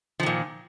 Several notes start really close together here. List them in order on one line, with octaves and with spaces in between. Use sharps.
F3 D#3 A#2